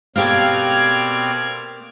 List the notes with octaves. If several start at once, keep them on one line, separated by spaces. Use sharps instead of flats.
B2 A#3 C4 G4 A4 D5 F6 G#6